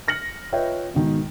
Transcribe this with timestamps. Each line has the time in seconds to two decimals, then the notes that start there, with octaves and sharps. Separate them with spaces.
0.08 F6 A#6 C#7 F#7
0.53 F4 B4 C#5 D#5 E5 G5
0.94 G#2 B2 D#3